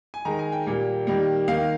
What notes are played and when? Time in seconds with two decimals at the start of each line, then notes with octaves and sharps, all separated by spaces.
0.14 G#5
0.25 D#3 G#3 A#5
0.39 G#5
0.52 G5
0.66 A#2 G3 A#3
1.07 D#3 G3 A#3
1.48 D#3 A#3 F5